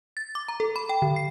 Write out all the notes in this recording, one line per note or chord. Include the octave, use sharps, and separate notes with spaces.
A6
D6
A#5
A4
B5
G5
D3
C7